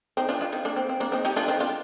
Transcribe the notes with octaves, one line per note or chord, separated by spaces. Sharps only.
C4 D#4
D4 F4
D4 F4
C4 D#4
A#3 D4
C4
C4
A#3 D4
C4 D#4
D#4 G4
D4 F4
C4 D#4
D4 F4